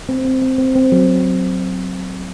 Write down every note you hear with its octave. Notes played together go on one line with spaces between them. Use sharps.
C4
C4
C4
C4
C4
F#3